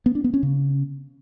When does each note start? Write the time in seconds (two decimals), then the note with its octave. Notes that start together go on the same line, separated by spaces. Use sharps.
0.06 B3
0.15 D4
0.24 B3
0.34 C#4
0.43 C#3